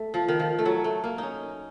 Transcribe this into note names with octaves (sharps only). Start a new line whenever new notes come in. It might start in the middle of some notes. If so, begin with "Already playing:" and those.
Already playing: A3
F3
D#3
F3
A3
F#3
A3
A#3
C#4 D#4